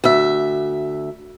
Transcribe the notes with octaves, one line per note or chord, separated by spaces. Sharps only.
D2 E5